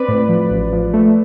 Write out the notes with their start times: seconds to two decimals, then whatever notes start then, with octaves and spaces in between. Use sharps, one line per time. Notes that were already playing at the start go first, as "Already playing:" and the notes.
Already playing: C4 B4 D5
0.09 A2
0.29 F3
0.50 A1
0.72 F3
0.94 A3